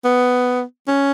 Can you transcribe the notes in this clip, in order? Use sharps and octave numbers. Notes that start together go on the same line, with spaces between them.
B3
C#4